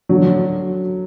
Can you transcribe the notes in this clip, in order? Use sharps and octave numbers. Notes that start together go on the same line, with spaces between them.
D3 F#3